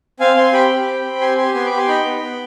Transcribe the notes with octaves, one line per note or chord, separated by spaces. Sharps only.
C4 F5 G#5
C4 G#5 C6
G4 G5 B5
G4
C4
C4
G4 G#5 C6
G4 G#5 C6
B3 G#5 C6
B5 D6
G4
G#5 C6
D#4 G5 B5
B3
B3